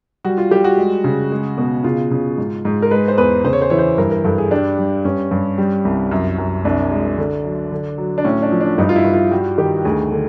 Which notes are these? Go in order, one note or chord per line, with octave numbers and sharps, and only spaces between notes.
G3 F#4
F4
G3 G4
F#4
G#3
C#3
G#3
B2
C#3 F4
C#3
G#2
G#2
A#4
G#3 B4
C5
E2 B4
C#3 C5
C#5
C5
E3 C#5
C5
G2 A#4
A#4
G2 A4
G#4
G3 D4
G3
G2 C#4
G2
G3
C2
F#2
F#2
C2 D4
G#3
D3
F#3
D3
F#3
D4
A2 C#4
D4
F3
D4
G2 D#4
F4
E4
G2
F4
G3 F#4
D#3 G4
D2 G#4
D3